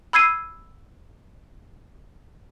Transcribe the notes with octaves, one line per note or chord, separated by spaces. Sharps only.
B5 E6 G#6 C7 D#7